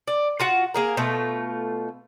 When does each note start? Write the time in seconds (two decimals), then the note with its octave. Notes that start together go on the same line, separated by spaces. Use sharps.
0.08 D5
0.40 F4 F#4 F#5
0.74 A#3 G#4 A#4
0.97 B2 A3 F4